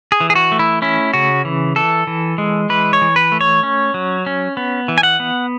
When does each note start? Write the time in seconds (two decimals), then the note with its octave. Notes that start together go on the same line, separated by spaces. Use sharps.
0.12 G#4
0.20 E3
0.30 G#4
0.35 F#4
0.52 A3
0.59 E4
0.82 C#4 E4
1.13 C#3 F#4
1.45 E3
1.76 E3 A4
2.07 E3
2.38 G#3
2.69 E3 B4
2.93 C#5
3.02 E3
3.16 B4
3.32 A3
3.41 C#5
3.63 C#4
3.94 F#3
4.26 C#4
4.57 B3
4.88 E3
4.98 G#5
5.03 F#5
5.20 B3